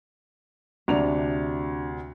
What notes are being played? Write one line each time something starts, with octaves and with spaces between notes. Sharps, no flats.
D2 C3 D4 A#5 F7